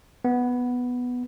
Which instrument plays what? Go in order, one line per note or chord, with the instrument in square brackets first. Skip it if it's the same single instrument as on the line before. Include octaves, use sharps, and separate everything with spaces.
[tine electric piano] B3